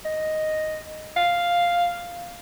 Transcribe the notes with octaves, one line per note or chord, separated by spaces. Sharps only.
D#5
F5